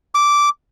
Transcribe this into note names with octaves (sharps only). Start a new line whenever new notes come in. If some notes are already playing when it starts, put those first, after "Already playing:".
D6